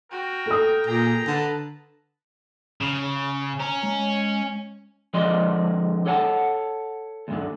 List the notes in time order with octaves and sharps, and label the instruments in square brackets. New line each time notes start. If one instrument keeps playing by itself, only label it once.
[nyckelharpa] F#4 [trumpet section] A#4 G5
[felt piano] A4 D#6
[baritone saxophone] A#2 [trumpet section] G4 G#4 G5 [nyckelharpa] A#5
[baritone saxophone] D3 [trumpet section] B4 A5
[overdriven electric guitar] C#3
[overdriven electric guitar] C#4 [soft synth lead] A#5
[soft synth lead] G#3
[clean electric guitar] D3 F3 G#3 D5 D#5 C6
A4 C#5 F#5 G#5 A5
D2 G2 D3